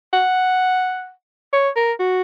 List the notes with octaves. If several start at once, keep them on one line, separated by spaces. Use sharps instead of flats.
F#5
C#5
A#4
F#4